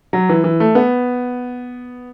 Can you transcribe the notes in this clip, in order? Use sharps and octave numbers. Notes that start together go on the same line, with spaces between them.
F#3
E3
E3
A3
B3